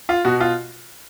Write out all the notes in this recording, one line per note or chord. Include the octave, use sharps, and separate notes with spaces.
F4
B2 F#4
F4